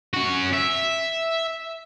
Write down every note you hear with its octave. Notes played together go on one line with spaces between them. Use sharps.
C#4 F#4
E5